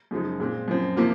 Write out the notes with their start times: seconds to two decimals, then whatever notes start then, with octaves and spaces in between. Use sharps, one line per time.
0.11 F#2 C#3 F3 G#3 D#4
0.40 A#2 G#3 C4
0.68 F#2 F3 C4
0.97 C3 F3 A#3 F4